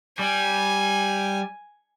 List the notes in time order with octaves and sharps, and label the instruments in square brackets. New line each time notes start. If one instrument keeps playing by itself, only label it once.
[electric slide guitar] G3 [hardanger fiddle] G#5